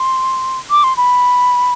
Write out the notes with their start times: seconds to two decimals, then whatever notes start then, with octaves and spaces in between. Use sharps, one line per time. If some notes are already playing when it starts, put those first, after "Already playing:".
Already playing: C6
0.70 D6
0.84 C6
0.97 B5